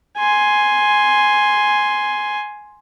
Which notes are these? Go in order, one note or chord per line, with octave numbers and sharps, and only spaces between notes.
G#5 C6